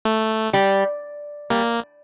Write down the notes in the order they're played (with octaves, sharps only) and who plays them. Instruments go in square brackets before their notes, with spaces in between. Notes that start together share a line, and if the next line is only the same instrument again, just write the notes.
[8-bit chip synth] A3
[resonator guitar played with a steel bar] G3
[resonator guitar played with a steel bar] G3 [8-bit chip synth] A#3